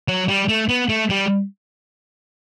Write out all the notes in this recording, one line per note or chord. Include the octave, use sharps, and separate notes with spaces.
F#3
G3
A3
B3
A3
G3